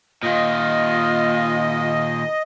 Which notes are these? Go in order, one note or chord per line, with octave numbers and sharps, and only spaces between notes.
A#2 D#3 F4 D#5